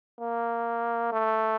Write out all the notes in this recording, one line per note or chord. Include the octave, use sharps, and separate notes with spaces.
A#3
A3